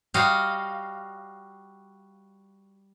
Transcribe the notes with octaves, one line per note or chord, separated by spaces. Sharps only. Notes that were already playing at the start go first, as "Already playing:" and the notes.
G3 F#4 D#5 F5